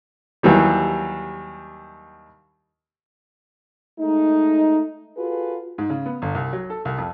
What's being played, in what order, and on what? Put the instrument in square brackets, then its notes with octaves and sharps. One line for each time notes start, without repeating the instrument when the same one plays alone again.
[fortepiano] D#2 E3 F#3 G3
[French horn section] G#3 A3 D#4
F4 F#4 G#4 A4 B4
[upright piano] G#2
C#3
B3
G1
C2
F#3
A4
C2
F2